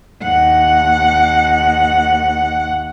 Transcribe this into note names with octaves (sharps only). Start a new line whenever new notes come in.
D#2 F#5